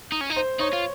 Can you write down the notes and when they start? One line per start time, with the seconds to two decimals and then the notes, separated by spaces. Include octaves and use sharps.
0.12 D#4
0.21 C#4
0.30 D#4
0.36 C5
0.60 D#4 C#5
0.73 F4